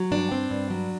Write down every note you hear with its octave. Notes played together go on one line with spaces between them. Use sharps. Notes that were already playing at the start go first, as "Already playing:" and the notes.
Already playing: F#3
G2 D4
C4
G2
F#3